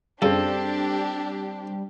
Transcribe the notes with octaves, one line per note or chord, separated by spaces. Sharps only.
F#2 C#3 G3 C4 D4 G4 A4